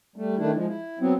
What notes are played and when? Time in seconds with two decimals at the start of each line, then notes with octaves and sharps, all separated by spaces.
0.16 G3 A3
0.37 D#3 A3 D4 E4
0.54 F3 G#3
0.66 E4
0.99 F#3 B3 C4